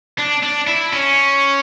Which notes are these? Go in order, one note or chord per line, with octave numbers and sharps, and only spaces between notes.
D4
D4
E4
C#4